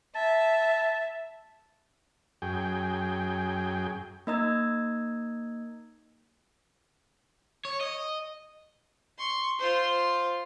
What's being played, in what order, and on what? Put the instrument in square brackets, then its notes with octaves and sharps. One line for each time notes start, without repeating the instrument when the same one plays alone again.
[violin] E5 [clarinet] A5
[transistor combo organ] F#2 G#4 G5
[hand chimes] A#3 D#4 D#5 A#5 E6 G#6
[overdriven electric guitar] C#5
D#5
[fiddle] C6 C#6
F4 C5